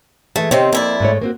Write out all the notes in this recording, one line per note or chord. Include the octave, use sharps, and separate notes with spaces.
E3 G#3 A3 G#4
C3 D#3 C4 C5 C#5
F2 A#3 E4 D5
G#2 A3 C#5
A#3 C4 F#4